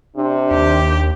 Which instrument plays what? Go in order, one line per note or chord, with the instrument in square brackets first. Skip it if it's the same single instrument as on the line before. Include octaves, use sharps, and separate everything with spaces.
[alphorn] C3 [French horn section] D4
[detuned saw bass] D#2 [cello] G4 G5